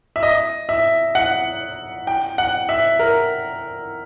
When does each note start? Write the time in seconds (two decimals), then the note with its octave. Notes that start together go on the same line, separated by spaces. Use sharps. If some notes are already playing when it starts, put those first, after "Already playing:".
0.16 E5
0.23 D#5
0.69 E5
1.15 F#5
2.07 G5
2.38 F#5
2.69 E5
2.99 A#4